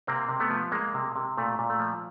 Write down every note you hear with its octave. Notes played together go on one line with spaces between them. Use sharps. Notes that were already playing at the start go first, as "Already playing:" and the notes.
C3 A#3 C4
C3
A3 B3
F3
G#3 A#3
C3
C3
A#2 A3
A#2
A3
F3